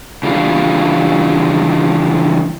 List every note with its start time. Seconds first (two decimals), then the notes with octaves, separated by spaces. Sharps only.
0.23 C#3 E3 G3 D4 F4